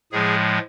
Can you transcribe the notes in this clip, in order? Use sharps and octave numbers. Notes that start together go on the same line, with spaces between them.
A2 F3 G#3 G#4